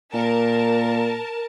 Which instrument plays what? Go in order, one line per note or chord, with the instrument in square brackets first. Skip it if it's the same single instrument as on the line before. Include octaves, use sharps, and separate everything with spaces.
[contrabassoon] A#2 [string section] A#4 A5